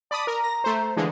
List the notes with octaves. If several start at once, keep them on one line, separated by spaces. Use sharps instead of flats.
D5 A5 B5 D#6
A#4 A#5
A#6
A3 C5
D3 E3 G#3 F5